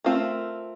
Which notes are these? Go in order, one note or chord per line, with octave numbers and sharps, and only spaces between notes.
A3 C4 F4 A#4